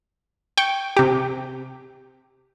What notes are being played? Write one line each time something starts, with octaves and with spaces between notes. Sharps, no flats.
G5 C#6
C3 G4